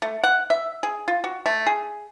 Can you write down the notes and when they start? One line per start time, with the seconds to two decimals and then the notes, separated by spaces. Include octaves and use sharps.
0.02 A3
0.24 F#5
0.50 E5
0.83 G#4
1.08 F4
1.24 F#4
1.46 A3
1.67 G#4